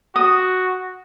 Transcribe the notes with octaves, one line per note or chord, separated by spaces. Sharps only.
F#4 D#6